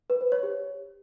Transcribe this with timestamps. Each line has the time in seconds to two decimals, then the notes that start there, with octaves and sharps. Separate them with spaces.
0.10 B4
0.21 C5
0.32 C#5
0.43 G4